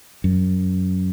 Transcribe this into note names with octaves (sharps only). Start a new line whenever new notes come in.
F#2